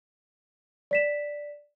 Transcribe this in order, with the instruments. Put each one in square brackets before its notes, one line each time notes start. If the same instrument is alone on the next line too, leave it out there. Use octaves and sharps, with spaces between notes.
[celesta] D5 B6 E7